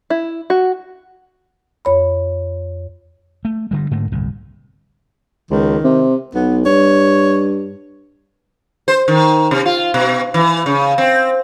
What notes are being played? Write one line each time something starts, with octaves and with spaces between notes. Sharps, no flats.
E4
F#4
F2 C#5 B5
A3
G2 D3 G3
G#2 D3 A3 A#3
G1 C2 A2
C#2 D#3
C3
B1 B3
G2 C#5
C5
D#3
C3
F4
B2
E3
C#3
C4